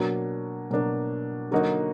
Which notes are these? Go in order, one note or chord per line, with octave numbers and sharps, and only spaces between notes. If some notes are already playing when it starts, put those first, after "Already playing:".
Already playing: B2 F#3 A#3 D4
B2 F#3 A#3 D4
D3 F#3 A#3 D#4 F#4